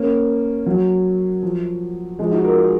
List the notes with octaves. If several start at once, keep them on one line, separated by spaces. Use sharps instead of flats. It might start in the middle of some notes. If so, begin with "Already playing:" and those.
Already playing: A#3 C#4
F#3
F3
F3 G#3
D#4 F#4
F#4 A#4
F4 G#4